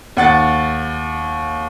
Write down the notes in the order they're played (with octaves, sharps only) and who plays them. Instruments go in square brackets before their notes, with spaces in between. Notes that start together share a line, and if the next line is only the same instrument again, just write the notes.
[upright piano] D#2 F#5 A6